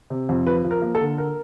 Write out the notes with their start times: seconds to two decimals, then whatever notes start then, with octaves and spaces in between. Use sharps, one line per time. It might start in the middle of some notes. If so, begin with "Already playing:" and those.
0.10 C3
0.29 F2
0.46 F3 B4
0.64 F3
0.71 A#4
0.82 A#3
0.95 A4
1.00 D3
1.18 A#4